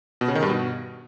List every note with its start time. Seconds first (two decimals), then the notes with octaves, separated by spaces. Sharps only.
0.21 B2
0.28 C#3
0.35 D#3
0.43 G2
0.50 B2